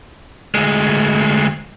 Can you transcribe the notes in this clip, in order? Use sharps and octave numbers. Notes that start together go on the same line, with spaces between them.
D2 G#3